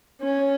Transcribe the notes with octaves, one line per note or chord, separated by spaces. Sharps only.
C#4